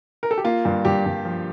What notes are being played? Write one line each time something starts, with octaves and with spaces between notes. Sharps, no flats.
A#4
A4
G4
A#3 F4
G2
G2 G4
G2
F3